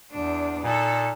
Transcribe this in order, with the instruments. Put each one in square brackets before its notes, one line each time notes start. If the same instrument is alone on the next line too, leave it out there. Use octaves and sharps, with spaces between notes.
[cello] E2 D4
[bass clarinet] A#2 [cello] D#4 A4